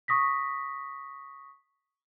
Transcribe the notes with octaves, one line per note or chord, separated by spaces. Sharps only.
C#6 D#6 A#6 B6